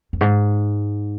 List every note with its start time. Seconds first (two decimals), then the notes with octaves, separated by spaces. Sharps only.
0.13 F2
0.21 G#2